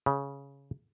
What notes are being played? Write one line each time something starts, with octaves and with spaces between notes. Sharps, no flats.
C#3